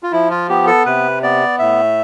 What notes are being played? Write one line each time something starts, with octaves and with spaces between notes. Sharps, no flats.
F4
F3 E4
F4
B3 G4
A4
C3 B4
B3 D5
A2 E5